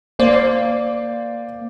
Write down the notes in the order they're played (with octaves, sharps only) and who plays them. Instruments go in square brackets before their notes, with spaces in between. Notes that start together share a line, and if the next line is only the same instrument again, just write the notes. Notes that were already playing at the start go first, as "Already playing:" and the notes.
[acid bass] A#3 [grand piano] C5 D5